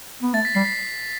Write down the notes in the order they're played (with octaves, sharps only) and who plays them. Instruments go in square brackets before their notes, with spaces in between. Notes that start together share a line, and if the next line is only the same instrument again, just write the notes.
[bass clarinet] B3
[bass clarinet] A3 [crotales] A6
[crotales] B6
[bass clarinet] G3 [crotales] C7
[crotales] B6